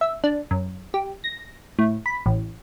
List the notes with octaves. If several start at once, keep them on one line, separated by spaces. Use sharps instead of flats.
E5
D4
F#2
G4
A#6
A2
B5
A1